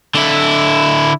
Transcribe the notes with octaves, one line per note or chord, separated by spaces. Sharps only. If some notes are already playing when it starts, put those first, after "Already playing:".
D3 E4